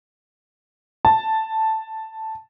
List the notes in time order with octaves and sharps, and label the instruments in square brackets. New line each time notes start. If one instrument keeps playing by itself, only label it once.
[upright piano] A5